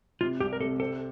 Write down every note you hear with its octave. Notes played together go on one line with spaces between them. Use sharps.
C3 F4
C2 G4
A#4
C3 A4
C4 A4